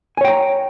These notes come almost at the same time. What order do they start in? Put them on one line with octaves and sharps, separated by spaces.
G#5 C#5 G5 A#5